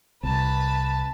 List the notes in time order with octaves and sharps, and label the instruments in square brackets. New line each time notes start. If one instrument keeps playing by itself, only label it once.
[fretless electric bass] C2 [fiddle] B4 A5